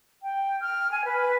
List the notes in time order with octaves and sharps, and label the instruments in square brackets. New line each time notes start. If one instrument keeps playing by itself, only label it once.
[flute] G5
F6
G#5
B4